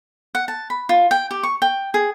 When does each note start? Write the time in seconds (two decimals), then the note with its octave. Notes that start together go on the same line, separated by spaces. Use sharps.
0.35 F#5
0.48 A5
0.70 B5
0.89 F4
1.11 G5
1.31 G4
1.43 C#6
1.62 G5
1.94 G#4